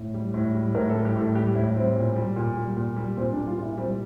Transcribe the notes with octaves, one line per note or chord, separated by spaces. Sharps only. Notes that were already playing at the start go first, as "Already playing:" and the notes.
Already playing: A2
G3
A2
G3
A2 A#4
A4
G3
G4
A2 A4
G3 G4
A2 E4
G3 C4
A#2
G3
A#2
G3
A#2
G3
A#2 C4
D4
G3
F4
A#2 E4
G3 C4